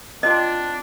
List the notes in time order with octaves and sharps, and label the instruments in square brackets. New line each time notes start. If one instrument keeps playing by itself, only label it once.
[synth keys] C4 F4 [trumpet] D4 [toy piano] D#5